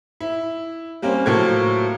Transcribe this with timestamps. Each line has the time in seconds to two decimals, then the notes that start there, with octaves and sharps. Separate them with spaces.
0.20 E4
1.02 G3 A#3 C4 C#4
1.26 A2 F3 F#3 A#3 A4 G#6